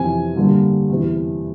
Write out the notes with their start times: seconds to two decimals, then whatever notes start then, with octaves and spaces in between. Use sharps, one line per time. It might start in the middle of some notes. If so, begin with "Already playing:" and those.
Already playing: F2 C3 E3 G#5
0.36 G2 D3 G3 A#3
0.89 E2 C3 E3